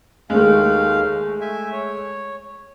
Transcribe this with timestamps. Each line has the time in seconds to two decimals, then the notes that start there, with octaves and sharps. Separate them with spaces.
0.30 D#2 G#3 A3 F5
1.41 E5 G#5
1.72 C#5